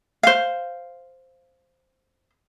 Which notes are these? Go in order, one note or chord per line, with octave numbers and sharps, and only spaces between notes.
C5 F5